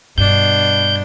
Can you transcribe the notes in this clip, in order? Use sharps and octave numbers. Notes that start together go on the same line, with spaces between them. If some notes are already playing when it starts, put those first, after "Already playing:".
G2 B2 D4 G6